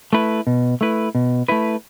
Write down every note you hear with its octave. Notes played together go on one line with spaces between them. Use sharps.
A3 E4 B4
B2
A3 E4 B4
B2
A3 E4 B4